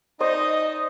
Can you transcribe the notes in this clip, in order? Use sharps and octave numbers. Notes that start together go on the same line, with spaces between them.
D#4 C5 D5 D#5 D#6